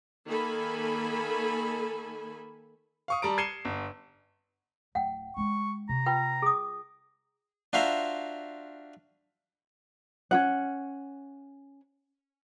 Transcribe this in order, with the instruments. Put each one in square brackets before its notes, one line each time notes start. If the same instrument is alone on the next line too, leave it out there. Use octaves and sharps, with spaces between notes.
[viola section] D#3 A#3 A4 G#5 B5
[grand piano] F5 C#6 D#6
G3 A5 A#5 D7
G#6 C7 C#7 D#7 E7 G7
G1
[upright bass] D1 F#3 [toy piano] F#5 G5
[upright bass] G#3 D#4 [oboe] C#6
[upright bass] C3 [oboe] A#5
[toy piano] F4 B4 G5
G#4 D#6
[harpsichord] D4 F4 F#4 C5 E5 A#5
[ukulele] C#4 F4 F#5